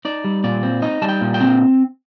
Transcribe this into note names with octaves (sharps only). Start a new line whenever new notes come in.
D#4 D5
G3
A#2 D5
C4
D#4 D#5
G3 A5
G5
A#2
G5
C4